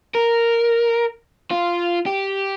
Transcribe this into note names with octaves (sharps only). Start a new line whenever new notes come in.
A#4
F4
G4